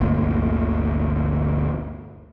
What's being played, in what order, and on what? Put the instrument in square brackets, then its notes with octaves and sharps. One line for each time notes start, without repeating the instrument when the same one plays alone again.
[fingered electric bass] G1 D2 A#2